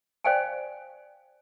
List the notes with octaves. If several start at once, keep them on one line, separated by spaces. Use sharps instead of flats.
C5 D5 F5 G5 G#5